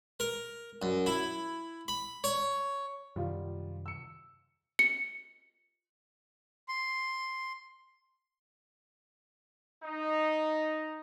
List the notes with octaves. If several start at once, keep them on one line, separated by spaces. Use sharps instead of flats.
A#4
F#2
E4
B5
C#5
F#2 C3 D#3 G3 F4
E6 C#7
C#7
C6
D#4